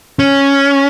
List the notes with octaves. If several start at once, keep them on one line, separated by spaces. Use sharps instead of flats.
C#4